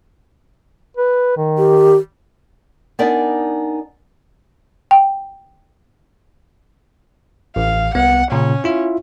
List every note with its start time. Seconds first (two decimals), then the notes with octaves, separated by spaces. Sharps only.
0.97 B4
1.37 D#3
1.58 G4
2.99 B3 D4 D#4 A#4 D5 G#5
4.91 G5
7.56 A1 F5
7.95 C2 B3 F#5
8.32 A#2 C#3 C#4
8.64 E4 F4 E5